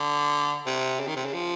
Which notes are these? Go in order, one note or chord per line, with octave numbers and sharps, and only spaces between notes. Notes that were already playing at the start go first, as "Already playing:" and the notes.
Already playing: D3
C3
C#3
D#3
C3
C#3
F3